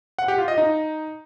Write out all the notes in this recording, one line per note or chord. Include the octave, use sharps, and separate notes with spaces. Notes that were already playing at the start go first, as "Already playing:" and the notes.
F#5
G4
F4
D#5
D#4